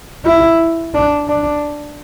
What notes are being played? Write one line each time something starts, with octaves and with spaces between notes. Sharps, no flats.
E4
D4
D4